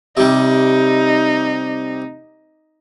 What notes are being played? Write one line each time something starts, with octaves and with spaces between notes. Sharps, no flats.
C3 G3 D#4